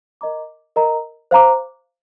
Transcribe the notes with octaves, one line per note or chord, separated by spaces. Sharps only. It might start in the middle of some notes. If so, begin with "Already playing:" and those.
A#4 D#5 A#5 D6
A#4 D#5 A#5
C5 F5 A#5 D6